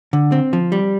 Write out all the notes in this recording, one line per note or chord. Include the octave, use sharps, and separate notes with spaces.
D3
C4
F3
G3